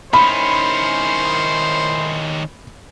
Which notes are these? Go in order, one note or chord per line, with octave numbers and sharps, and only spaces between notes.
D#3 C#4 E4 C5 B5